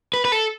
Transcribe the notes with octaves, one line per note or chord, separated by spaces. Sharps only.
B4
B4
A4